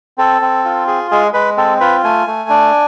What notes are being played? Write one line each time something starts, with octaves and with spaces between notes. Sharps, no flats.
C4 A4
C4
F4
G#4
G#3 G#4
G#3 B4
C4 A4
F4 B4
A3 G#5
A3
D4